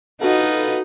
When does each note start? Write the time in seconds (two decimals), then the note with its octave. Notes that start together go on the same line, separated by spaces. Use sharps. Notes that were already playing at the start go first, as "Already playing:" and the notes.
0.21 D#4 F4 F#4 A4 B4 F#5